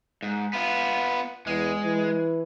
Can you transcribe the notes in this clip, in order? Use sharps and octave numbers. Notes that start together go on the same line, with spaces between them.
G#2
B3 F4
E2 G#3
E3